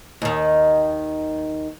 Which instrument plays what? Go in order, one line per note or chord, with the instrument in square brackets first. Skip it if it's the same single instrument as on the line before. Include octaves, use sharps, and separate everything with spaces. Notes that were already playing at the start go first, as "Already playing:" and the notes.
[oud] D#2 D#3